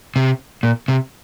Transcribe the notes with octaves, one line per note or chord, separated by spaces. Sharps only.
C3
A#2
C3